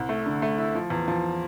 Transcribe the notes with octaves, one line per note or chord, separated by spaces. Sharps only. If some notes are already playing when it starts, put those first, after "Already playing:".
Already playing: C2
A3
D3
A3
E4
F3
E2
F3